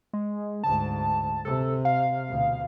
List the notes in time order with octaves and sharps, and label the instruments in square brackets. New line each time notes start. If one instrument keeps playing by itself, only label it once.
[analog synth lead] G#3
[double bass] D2 G#2 [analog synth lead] A5
[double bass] C3 [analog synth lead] A4
[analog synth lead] F5
[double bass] D2 B2